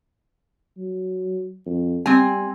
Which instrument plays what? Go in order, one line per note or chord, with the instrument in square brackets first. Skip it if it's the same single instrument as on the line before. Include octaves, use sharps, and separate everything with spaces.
[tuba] F#3
F2
[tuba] G3 [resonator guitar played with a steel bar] C4 G#5